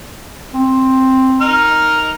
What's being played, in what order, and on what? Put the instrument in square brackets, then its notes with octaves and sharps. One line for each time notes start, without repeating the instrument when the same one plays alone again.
[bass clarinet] C4
[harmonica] D#4 A#4 F6